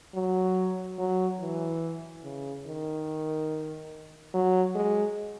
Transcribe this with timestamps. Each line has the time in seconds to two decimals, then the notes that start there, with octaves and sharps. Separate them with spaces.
0.15 F#3
0.98 F#3
1.40 E3
2.24 C#3
2.66 D#3
4.34 F#3
4.75 G#3